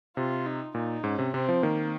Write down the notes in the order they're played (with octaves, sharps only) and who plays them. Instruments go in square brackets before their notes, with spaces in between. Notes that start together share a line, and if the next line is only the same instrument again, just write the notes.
[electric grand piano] C3 [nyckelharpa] F4
[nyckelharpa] D#4
[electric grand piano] A#2 [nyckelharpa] D#4
[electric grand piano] G#2 [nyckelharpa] C#4
[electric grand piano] C3
[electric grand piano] C3 [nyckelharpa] C4
[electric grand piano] F3
[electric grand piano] D#3 [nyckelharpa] A#3